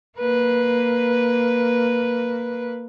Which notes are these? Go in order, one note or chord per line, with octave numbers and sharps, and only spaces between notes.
A#3 B4